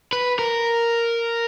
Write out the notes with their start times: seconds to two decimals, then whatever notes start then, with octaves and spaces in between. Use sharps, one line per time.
0.13 B4
0.39 A#4